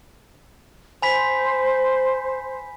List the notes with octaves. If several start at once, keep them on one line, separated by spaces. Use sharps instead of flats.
C5 G#5 B5 B6